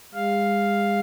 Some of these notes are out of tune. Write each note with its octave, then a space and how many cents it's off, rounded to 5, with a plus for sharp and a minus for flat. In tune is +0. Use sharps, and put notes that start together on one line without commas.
G#3 -40 F5 +0